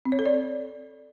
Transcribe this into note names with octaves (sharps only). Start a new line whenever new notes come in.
C4
C#5
A4
D5